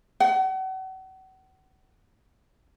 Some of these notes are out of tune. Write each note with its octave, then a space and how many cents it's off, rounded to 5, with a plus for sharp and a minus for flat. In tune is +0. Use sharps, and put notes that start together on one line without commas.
F#5 +40